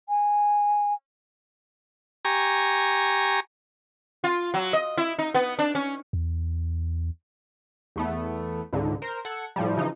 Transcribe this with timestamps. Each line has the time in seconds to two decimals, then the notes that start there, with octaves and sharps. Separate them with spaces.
0.09 G#5
2.25 G4 G#5 A#5 C#6
4.24 F4
4.54 F#3
4.73 D#5
4.97 E4
5.19 D#4
5.34 B3
5.59 D4
5.75 C#4
6.13 E2
7.96 E2 A3 B3
8.73 C#2 G#2 D3
9.02 A#4 C5
9.25 A4 F#5 G#6 C#7
9.56 A2 F3 G3
9.77 C#3 E3 F3 D#4